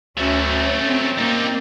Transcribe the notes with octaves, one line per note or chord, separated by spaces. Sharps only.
D2 F#3 A3 C#4
C#4
C4
G3 A#3 D#4